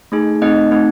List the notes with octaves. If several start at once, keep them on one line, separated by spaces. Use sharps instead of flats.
A3 D#4 G#4
A3 C4 D#4 D#5
A3 C4 D#4